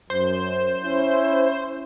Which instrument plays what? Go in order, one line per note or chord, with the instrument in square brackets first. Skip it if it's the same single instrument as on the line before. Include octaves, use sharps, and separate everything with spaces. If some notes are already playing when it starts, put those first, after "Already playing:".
[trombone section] F#2 [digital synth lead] C5
[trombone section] C#4 E4